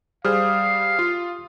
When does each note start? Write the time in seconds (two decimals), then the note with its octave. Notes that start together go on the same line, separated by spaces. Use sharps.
0.25 G3 G#4 C5 F5 D#6 F6
0.99 F4